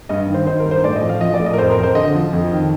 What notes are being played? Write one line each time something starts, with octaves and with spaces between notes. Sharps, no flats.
G2 D#5
D#3
C5
D#3 C5
A#4
G2
C5
A2 D5
D#5
F3
F5
F3 D#5
D5
A2
D#5
A#4
F2 C5
A#4
F2
C5
D3 D#5
F3
F2
D#3